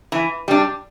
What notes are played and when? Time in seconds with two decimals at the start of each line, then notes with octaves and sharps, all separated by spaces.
0.12 E3
0.48 G3 D4